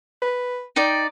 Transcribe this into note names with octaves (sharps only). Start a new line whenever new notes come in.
B4
D#4 D5 G5